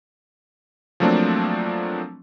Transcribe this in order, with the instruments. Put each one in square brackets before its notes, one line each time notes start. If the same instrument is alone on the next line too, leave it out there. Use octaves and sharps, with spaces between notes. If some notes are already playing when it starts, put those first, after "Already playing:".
[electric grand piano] F3 F#3 A3 A#3 C4 D4